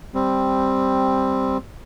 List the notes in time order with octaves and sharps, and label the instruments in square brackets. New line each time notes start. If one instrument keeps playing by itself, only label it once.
[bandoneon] G3 C4